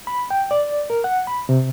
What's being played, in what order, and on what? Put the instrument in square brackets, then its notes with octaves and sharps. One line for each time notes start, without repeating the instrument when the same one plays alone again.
[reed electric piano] B5
G5
D5
A#4
F#5
B5
C3